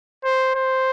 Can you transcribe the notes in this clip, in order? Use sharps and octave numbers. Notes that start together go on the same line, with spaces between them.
C5
C5